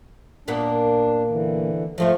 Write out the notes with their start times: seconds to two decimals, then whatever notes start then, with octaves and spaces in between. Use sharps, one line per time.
0.48 A#2 A#3 B3 D4
1.30 D3 E3
1.98 F2 F3 A3 F4